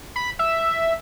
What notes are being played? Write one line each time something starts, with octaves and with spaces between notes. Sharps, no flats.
B5
E5